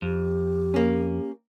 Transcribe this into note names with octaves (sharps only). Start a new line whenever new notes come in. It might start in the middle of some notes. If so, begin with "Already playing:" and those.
F2 G4
A#3 C#4